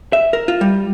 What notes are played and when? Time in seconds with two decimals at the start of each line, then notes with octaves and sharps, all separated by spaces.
0.13 E5
0.33 A#4
0.48 F4
0.61 G3